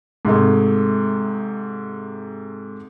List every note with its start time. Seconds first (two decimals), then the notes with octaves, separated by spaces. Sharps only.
0.25 G#2 C3 G#3 A3